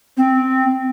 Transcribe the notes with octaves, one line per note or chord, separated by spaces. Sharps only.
C4